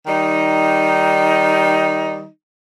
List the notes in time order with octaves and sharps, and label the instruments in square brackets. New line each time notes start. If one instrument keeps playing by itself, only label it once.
[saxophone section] D#3 G3 D#4